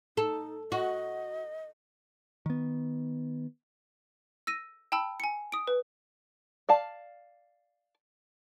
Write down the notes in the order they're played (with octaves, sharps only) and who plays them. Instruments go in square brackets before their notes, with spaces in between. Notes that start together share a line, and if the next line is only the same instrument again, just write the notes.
[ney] D#4 [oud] A4
[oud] F#4 [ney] D#5
[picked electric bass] D#3 B3
[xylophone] E6 A#6 D#7
G5 A5 B5 E6
G#5 C#7
D#6 D7
B4
[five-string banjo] D5 F5 A5